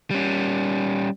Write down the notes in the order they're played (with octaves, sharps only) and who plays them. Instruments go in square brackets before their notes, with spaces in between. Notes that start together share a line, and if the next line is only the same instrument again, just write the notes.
[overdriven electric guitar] G3 C#4